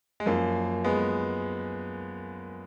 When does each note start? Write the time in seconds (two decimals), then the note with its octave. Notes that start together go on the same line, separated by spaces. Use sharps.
0.20 G#3
0.26 F#2 F3 A#3
0.84 G#3 B3